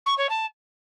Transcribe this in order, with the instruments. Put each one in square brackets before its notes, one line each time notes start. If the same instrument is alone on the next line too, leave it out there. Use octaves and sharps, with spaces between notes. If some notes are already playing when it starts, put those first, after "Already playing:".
[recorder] C#6
C#5
A5